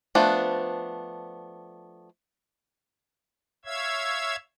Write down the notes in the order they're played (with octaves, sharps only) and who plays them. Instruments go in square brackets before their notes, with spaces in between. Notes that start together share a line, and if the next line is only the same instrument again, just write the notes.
[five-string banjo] F3 A3 B3 D4
[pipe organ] C#5 E5 F5 E6 G#6